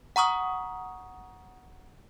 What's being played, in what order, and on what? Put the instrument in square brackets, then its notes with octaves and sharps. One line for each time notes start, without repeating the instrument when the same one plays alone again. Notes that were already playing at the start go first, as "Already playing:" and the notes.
[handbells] F#5 A#5 C#6 D#6 F6